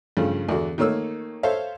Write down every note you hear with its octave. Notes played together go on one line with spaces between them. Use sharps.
G2 C#3 F3 A3
E2 D3 F#4
D#3 A3 A#3 C#5 E6
A4 C5 C#5 E5 F5